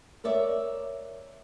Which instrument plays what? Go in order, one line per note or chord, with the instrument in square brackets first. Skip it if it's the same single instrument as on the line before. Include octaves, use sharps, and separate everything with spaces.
[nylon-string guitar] A#4 C#5 D5 E5